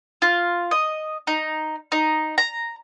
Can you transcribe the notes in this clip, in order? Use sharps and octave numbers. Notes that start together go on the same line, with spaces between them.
F4
D#5
D#4
D#4
A#5